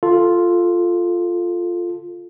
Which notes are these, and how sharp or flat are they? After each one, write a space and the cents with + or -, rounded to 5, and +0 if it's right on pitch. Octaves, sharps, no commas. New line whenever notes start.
F4 +0 A4 +0